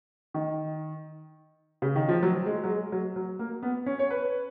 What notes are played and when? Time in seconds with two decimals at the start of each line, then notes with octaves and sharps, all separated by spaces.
0.34 D#3
1.82 C#3
1.96 D#3
2.09 F3
2.23 F#3
2.46 G#3
2.64 F#3
2.69 G#3
2.92 F#3
3.16 F#3
3.39 A#3
3.63 B3
3.86 C#4
3.99 C#5
4.10 B4